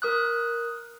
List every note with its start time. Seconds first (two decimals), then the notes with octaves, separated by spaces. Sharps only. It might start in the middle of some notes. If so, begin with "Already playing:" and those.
0.02 A#4 D#6 F#6